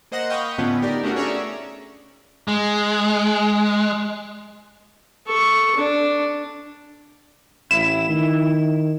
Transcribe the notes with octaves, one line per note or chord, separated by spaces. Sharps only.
A#3 C5 D#5 F#5 A#6 E7
D#5 F5 G5 B5 C#6 D#6
A2 D3 B3 C#4 F4
D#4 G4 A#4 D5
A3 C#4 D4 F#4 A#4
C#4 G#4 C#5 D5 E5 A#5
G#3
A4 C#6
D4
A1 E4 E7
D#3